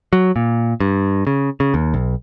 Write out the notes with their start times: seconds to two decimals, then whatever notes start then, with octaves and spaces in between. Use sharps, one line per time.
0.13 F#3
0.36 A#2
0.80 G2
1.27 C#3
1.60 C#3
1.74 D#2
1.94 B1